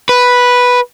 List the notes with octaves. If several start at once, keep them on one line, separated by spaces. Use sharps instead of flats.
B4